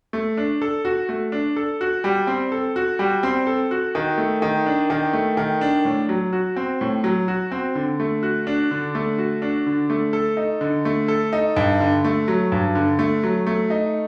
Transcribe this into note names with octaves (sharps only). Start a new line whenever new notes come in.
A3
D4
A4
F#4
A3
D4
A4
F#4
G3
C4
A4
F#4
G3
C4
A4
F#4
D#3
A3
D#3
D4
D#3
A3
D#3
D4
A2
F#3
F#4
C4
A2
F#3
F#4
C4
D3
A3
F#4
D4
D3
A3
F#4
D4
D3
A3
A4
D#4
D3
A3
A4
D#4
G2
D3
A3
F#3
G2
D3
A3
F#3
A3
D#4